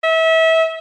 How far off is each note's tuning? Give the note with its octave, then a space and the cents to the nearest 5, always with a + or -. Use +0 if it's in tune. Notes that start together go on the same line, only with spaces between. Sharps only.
E5 -30